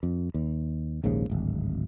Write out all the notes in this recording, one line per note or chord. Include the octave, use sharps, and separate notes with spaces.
F2
D#2
A#1 D#2 G#2 C#3
D1 G#1